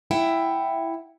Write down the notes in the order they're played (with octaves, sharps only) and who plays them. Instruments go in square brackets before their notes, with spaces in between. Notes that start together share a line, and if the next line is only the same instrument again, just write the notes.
[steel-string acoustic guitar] E4 E5 F#5 G5